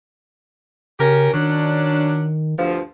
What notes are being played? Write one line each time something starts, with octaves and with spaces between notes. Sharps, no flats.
C#3 C#4 G4 A#4
D#3 F#3 C#4 D4
D2 G2 F3